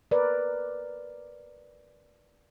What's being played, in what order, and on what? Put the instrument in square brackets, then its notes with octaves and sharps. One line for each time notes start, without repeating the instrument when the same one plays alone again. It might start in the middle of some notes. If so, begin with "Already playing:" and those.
[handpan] A#4 B4 D5